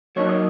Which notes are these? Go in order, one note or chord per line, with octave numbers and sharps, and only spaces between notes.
F#3 A#3 D#4 C#5
D#5